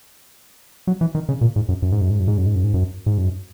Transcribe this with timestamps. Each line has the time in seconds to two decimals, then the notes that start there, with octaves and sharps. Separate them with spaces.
0.87 F#3
1.01 E3
1.15 D#3
1.29 C#3
1.41 A#2
1.56 G#2
1.69 F#2
1.82 F#2
1.92 G#2
2.01 F#2
2.10 G#2
2.20 F#2
2.28 G#2
2.38 F#2
2.46 G#2
2.55 F#2
2.64 G#2
2.74 F#2
3.06 G#2
3.18 F#2